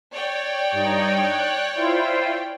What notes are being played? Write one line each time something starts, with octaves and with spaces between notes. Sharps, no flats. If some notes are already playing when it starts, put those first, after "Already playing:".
C#5 D5 G5
G2 D#4
F#6
E4 F4 C5